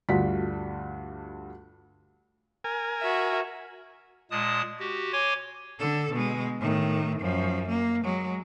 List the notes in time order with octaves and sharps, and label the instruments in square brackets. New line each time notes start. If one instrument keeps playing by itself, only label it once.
[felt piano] D2 G2 F4 F#4 B6
[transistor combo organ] A#4 G#5
[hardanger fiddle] F#4 E5
[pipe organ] A#2 G#3 A5 D#6
F#4 G4
C#5 G#5 C6 D6
[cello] D3 A4
B2 G#3
A2 D#3
F#2 F3
A#3
F#3 G#3